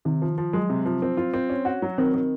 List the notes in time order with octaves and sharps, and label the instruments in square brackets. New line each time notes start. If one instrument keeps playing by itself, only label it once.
[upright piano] C3 [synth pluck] D#3
[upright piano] F3
F3
[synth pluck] F#3 [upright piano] G#3
[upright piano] C3
F3
C4
F4
C4
C#4
F#4
F#3
[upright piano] D#3 [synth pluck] C4
[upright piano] D#3